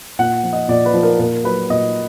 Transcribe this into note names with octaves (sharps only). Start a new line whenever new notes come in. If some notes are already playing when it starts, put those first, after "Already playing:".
A#2 F#5
F3
D#5
A#2 D5
B4
F3
A#4
A#2 A#4
F#3 B4
A#2 D#5